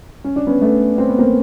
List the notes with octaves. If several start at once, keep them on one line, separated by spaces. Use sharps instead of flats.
C#4
D4
B3 C#4
A3 B3
C4
B3
A#3 C4